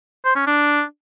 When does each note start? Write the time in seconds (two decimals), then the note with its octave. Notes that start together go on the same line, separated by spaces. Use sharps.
0.25 C5
0.36 C#4
0.47 D4